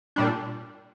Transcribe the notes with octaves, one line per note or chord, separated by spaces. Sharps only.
A#2 G3 D4